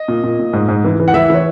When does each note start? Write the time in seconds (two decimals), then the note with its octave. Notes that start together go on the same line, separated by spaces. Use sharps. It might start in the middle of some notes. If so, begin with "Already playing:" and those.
Already playing: D#5
0.08 A#2
0.24 A#2
0.39 A#2
0.53 G#2
0.68 G#2
0.84 E3
1.00 E3
1.08 F#5
1.14 E3 E5
1.30 E3 C#5